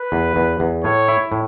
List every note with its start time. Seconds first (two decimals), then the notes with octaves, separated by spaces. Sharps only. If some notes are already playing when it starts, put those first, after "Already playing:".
Already playing: B4
0.12 E2
0.36 E2
0.60 E2
0.84 A2 C#5
1.08 E4
1.32 A2